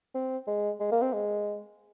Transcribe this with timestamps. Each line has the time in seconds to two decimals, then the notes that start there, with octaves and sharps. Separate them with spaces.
0.14 C4
0.47 G#3
0.80 G#3
0.91 A#3
1.02 C4
1.13 G#3